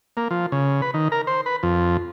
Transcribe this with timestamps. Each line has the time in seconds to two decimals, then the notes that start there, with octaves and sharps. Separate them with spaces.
0.17 A#3
0.31 F3
0.52 C#3
0.82 B4
0.94 D#3
1.12 A#4
1.27 C5
1.46 B4
1.63 F2